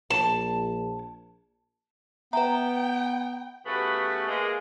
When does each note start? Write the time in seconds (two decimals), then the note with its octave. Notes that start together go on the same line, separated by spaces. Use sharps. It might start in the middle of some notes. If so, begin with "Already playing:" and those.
0.10 A#1 A5
2.33 B3 B4 E5 G5 A#5
3.66 C#3 A3 B3 F#4 G4 B4
4.28 G#3 A#3